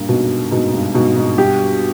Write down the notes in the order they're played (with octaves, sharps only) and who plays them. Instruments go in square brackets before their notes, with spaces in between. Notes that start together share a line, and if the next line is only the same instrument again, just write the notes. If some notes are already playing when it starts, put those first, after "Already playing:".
Already playing: [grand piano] G2 A#2 [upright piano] A#3
[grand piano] G#2 [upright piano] B2
[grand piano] G#2 [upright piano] B2
[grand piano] G2
[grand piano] G#2 [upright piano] B2
[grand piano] G#2
[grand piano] G2 [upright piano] G4